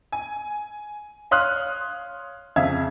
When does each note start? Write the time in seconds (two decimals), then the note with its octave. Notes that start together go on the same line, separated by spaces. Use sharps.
0.12 G#5
1.31 C#5 F5 C6 D#6 F6 F#6
2.56 F2 C#3 E5 F5 G#6